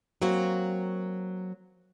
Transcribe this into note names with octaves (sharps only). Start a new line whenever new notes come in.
F#3 A#3 C4 F#4